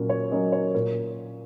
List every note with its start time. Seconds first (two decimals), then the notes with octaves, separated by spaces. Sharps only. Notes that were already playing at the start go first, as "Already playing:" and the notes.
Already playing: A#2 F#3 C#4 A#4
0.09 C#5
0.32 F#3 A#3 C#4 D#5
0.52 C#5
0.75 A#2 A#4